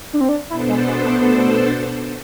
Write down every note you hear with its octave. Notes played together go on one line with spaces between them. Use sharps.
D4
C4
D4
B2 B3 D4 E4 A4 C5
G#3
G#3
A3